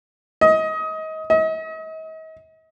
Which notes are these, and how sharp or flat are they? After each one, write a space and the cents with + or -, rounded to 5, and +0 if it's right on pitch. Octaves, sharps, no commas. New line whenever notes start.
D#5 +25
D#5 +40